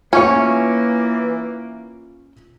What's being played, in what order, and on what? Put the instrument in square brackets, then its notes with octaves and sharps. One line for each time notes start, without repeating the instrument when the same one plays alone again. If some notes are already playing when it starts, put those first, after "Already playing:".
[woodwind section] E3 [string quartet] A#3 [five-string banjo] C#4 [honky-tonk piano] F4 C#6 C#7